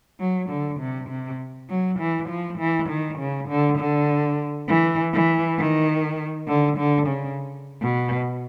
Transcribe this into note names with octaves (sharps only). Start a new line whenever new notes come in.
F#3
D3
C3
C3
F#3
E3
F3
E3
D#3
C#3
D3
D3
E3
E3
D#3
D3
D3
C#3
B2